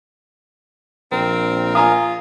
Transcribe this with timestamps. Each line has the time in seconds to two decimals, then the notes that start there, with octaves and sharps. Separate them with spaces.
1.12 A#1 C4 A#4
1.75 F4 G#5 A#5 D#6